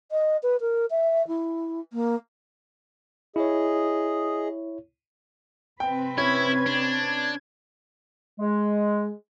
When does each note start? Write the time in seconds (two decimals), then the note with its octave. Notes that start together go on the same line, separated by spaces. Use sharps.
0.11 D#5
0.43 B4
0.60 A#4
0.90 E5
1.27 E4
1.93 A#3
3.36 E4 G#4 C#5 D#5
5.80 C3 C4 B4 G5
6.18 C#4 E4 G#6
6.66 D4
8.39 G#3